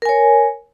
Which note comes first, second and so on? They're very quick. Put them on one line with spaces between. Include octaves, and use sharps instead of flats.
A#4 G#5 C#5